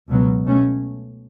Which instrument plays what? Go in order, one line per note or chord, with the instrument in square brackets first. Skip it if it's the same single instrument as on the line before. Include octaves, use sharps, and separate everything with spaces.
[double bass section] C#2 B2 F#3 B3
B2 A3 C#4